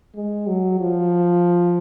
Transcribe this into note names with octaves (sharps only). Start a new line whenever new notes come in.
G#3
F#3
F3